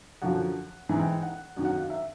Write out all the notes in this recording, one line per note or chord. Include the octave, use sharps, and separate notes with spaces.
F#2 D3 F3 F#5
G#2 E3 G#5
G5
F#5
F#2 D#3
F#5
F5
E5